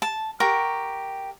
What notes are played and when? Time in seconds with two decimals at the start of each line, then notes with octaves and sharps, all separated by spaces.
0.02 A5
0.40 G4 A#4 F#5 C#6